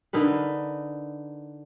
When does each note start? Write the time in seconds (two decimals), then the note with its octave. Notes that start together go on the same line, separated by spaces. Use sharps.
0.13 D3 D#4 A#4 B4